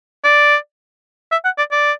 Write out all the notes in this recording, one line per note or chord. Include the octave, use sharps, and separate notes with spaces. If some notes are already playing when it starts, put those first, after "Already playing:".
D5
E5
F#5
D5
D5